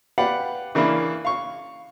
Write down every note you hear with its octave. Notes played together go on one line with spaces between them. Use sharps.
G4 B4 D5 F5 F#5
C#3 E3 A#3 D4 E4
F5 C#6